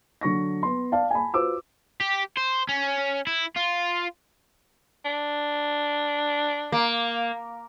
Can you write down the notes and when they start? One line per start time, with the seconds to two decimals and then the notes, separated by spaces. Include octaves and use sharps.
0.21 D3 F#3 C#6 A#6
0.63 B3 C6
0.92 D5 F5 A5
1.11 G#5 A5 B5
1.34 F4 F#4 B4 C5 D6 E6
2.01 G4
2.37 C5
2.69 C#4
3.27 E4
3.56 F4
5.05 D4
6.72 A#3